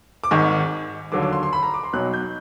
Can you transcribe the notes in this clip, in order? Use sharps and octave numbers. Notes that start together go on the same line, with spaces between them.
D6
G#1 G#2 D#3 C#6
D#2 D3 F#3 D6
D6
C6
C6
B5
A#5
D6
C6
B1 B2 F#3 F#6
G6